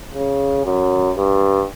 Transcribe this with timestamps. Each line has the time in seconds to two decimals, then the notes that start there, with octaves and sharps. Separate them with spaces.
0.14 C#3
0.65 F#2
1.17 G2